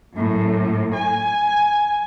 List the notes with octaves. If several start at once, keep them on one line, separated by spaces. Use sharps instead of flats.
F#2 A2
G#5